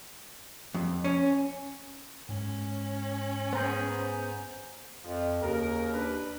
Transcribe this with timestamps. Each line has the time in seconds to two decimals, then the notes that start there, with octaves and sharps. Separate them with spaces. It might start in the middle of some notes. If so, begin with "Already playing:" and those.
0.74 F2
1.04 C#4
2.29 G#2 G#3 C#4
3.53 B3 G#4 C5 A#5 G6
5.04 F2 F3
5.42 D#2 C#3 A#4
5.92 D4 B4